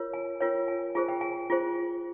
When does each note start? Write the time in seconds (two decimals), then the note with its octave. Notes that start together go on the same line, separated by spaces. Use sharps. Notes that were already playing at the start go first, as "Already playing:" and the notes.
Already playing: F4 A#4 C#5
0.13 G#5
0.41 F4 A#4 C#5 G5
0.68 G#5
0.95 F4 G#4 C5 G#5
1.09 G5
1.21 G#5
1.50 F4 G#4 C5